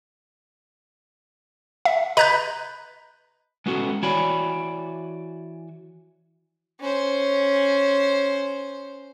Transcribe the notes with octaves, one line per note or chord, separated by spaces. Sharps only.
E5
B4 D#5 A#5 F#6 G6
G#3 B3 C#4 F#4 A4
E3 F#4 C#5 D5 G#5 B5
C#4 C5